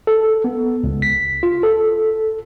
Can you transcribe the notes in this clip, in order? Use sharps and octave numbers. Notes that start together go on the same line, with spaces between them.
A4
B3
C#2
B6
F4
A4